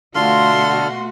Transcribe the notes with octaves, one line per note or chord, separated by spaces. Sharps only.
B2 D3 A3 F4 F#4 A4 C6 F6